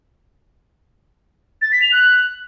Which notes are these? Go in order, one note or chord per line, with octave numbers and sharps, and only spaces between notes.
A6
B6
F7
F#6